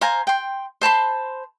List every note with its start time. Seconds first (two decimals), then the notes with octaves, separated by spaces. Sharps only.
0.01 C5 F5 G#5 A#5
0.27 G5 C6
0.81 C5 A5 B5 C6